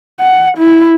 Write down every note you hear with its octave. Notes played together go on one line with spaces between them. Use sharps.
F#5
E4